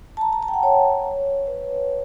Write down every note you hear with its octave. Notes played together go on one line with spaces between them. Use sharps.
A5
A#5
A#5
A5
G5
F#5
C#5
B4